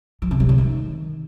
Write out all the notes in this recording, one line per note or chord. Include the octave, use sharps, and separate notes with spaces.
F3
C3
G3
C#3
D#3